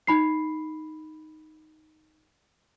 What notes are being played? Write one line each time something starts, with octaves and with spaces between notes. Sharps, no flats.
D#4 B5 C7